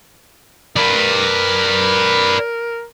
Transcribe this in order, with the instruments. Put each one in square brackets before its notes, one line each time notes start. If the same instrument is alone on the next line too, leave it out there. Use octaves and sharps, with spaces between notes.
[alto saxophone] A#4 [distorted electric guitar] B4 D5